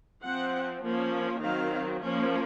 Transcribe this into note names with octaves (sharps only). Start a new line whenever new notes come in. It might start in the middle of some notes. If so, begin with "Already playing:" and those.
F3 C4 F#5
F3 A#3 C#4
D#3 F#3 C4 F5
F3 A#3 C#4